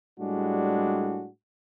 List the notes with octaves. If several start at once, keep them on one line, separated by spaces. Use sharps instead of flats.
A2 G3 G#3 D4 F#4 G#4